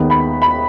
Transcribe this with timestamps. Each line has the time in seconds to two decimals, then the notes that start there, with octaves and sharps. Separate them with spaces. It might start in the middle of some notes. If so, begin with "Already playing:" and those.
Already playing: D#2 D#3 G#3 B3
0.10 B5
0.42 B5